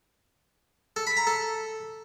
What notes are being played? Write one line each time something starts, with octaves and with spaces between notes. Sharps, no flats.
A4
B5
A#5
A4